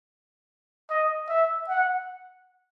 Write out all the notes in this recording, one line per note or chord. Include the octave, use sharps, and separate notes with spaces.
D#5
E5
F#5